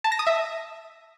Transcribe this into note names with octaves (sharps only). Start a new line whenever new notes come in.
A5
A#6
D#6
E5